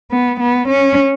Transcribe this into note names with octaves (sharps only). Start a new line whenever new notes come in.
B3
B3
C#4